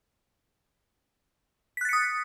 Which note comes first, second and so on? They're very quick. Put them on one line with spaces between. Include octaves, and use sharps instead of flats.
B6 F#6 A6 C#7 D#6